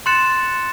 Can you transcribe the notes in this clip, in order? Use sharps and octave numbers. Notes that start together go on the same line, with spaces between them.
C6 F#6 A6 C#7 E7